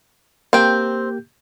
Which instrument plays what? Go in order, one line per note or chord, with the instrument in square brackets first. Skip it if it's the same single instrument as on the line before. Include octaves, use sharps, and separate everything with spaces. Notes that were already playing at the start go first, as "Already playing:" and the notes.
[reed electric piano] A#3 G4 G6 [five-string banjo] C4 G5